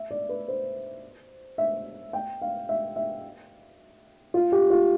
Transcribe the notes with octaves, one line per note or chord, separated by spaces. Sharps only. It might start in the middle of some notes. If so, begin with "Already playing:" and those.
Already playing: E5
D5
B4
C5
E5
G5
F5
E5
E5
F4
G4
F4